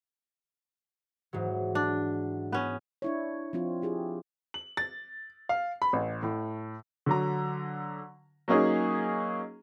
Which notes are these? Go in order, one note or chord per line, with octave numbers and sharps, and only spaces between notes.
G#2 E3 F#3
D4
B3 C#4
D4 E4 C#5
F3 C4 F4
E4 G4 G#4
F#7
A6
F5
B5
A1
A2
D3 F#3 A#5
F#3 A#3 C#4 D#4 G#4